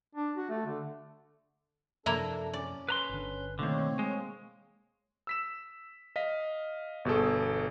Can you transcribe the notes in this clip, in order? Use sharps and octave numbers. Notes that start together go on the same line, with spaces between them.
D4
F#4
A3
D3
F#2 C3 F3 A#3 D4 E4 A4 A#4
C#4 D5
B4 A#5 C6
G1 D3
B2 D3 D#3 A3 A#3 C4 C#5
G#3
E6 B6 E7
D#5 F5 B6
G1 B2 G#4 A4